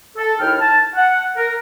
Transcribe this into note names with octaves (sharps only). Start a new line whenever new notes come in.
A4
D#2 D#4 E4 G5 F6
A5
F#5
A#4